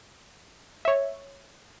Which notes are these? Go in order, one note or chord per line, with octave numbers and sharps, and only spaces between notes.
C#5 E5